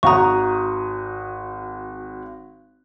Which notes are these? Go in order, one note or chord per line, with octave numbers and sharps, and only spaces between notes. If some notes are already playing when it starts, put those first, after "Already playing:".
G#1 F#4 A#5 C#6 D#6